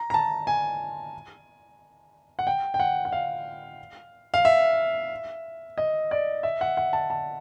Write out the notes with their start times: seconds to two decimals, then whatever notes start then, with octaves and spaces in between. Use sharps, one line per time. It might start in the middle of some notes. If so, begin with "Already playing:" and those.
Already playing: A#5
0.10 A#5
0.14 A5
0.47 G#5
2.39 F#5
2.47 G5
2.74 G5
2.80 F#5
3.05 F#5
3.12 F5
4.34 F5
4.45 E5
5.78 D#5
6.11 D5
6.43 E5
6.61 F#5
6.77 F#5
6.93 A5
7.10 A5